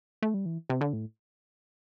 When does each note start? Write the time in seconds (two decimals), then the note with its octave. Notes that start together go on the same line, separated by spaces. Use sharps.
0.22 A3
0.34 G3
0.46 E3
0.70 C3
0.81 D3
0.93 A2